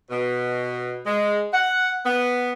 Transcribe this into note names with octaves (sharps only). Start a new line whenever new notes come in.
B2
G#3
F#5
B3